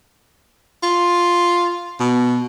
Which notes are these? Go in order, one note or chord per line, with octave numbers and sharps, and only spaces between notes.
F4
B2